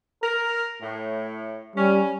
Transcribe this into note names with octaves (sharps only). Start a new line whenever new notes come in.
A#4
A2
G3 C#4